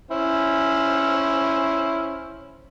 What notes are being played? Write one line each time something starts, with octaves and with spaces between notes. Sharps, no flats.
C#4 E4 C5